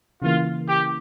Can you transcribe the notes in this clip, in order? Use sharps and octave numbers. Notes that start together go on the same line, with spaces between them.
C#3 E3 A#3 F4
G4